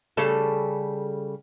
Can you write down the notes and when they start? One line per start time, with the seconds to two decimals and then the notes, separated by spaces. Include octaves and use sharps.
0.17 C#3 G3 A4